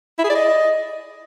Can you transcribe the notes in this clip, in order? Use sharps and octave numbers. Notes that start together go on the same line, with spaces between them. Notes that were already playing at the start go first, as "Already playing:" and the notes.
E4
G#4
D5
D#5